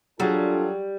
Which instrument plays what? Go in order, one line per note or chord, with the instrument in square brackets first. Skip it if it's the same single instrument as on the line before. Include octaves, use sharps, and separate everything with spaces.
[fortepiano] F#3 G#4 [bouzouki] G3 [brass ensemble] D4 F4 A4